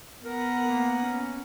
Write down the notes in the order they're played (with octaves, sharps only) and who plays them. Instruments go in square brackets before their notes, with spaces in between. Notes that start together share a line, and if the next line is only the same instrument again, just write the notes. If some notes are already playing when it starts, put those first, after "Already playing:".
[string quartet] B3 F#5 A#5 [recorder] A#4
[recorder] A#3
C#4